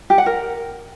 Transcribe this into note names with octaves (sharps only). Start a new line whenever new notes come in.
G4
F#5
A#4